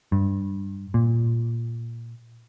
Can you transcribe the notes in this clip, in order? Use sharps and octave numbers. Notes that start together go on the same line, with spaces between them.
G2
A#2